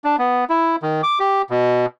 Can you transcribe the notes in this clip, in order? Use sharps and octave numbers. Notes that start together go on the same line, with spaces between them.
D4
B3
E4
D#3
D6
G4
B2